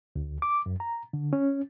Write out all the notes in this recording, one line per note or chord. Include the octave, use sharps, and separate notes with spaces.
D2
D6
F#2
A#5
D3
C#4